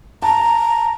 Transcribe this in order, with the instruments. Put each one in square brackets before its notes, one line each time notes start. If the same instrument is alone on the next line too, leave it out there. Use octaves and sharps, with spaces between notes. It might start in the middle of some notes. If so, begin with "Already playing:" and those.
[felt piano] A5 [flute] A#5